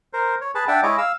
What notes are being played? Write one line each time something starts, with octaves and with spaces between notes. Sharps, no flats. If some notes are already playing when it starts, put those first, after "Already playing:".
A#4 C5
C#5
G#4 B4 A5
D4 E5 F#5 G5 A5
G#3 E4 C#5 D#5 D6
F5 E6